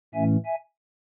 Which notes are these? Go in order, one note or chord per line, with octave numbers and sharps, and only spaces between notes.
A2 E3 A3 C#4 E5 G#5
E5 G#5